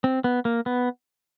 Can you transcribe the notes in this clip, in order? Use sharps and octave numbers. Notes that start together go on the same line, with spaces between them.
C4
B3
A#3
B3